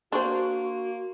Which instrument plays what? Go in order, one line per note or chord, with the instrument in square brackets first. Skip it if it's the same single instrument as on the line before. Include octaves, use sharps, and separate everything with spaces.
[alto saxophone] A#3 [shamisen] D4 C5 [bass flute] F#4 [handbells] C6 C#6